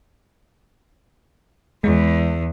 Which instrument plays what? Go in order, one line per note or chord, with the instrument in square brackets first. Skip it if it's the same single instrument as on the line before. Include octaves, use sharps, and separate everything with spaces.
[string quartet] E2 [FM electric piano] G#3